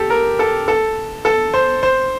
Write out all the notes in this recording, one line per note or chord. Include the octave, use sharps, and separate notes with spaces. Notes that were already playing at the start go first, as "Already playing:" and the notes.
Already playing: G4 A4
A#4
A4
A4
A4
C5
C5